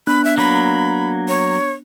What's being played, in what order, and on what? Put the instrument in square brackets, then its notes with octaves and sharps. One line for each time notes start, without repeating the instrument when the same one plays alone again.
[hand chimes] B3 D4 F#6 [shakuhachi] B5
[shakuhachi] E5
[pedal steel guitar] F#3 A#3 [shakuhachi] B5
[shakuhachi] C#5